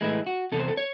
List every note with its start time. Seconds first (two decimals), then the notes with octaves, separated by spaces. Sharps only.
0.01 A2 E3 G#3 E4
0.27 F#4
0.52 E2 C3 A4
0.60 C5
0.68 A4
0.77 C#5